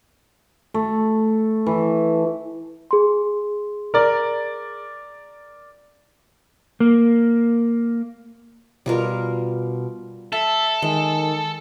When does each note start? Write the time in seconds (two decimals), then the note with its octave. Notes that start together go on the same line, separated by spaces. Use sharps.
0.74 A3
1.66 E3
2.91 G#4 C6
3.94 A#4 D5
6.80 A#3
8.86 B2 G3 F4 A#4
10.32 A4 E5 A5
10.82 D#3 G#3